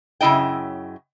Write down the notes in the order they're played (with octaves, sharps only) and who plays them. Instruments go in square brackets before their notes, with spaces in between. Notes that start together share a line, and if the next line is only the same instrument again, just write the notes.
[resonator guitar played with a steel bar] F#2 C#3 E4 D#5 G5